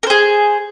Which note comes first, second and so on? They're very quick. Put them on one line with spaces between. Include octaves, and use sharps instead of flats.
A#4 C5 G#4